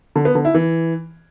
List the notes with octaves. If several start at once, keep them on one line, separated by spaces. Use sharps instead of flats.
D3
B3
D3
E4
E3